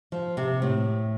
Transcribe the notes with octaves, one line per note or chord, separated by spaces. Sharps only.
F3
C3
A2